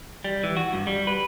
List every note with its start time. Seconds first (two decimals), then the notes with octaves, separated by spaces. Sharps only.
0.24 G3
0.43 E3
0.57 F#4
0.73 G2
0.87 G3
1.07 B4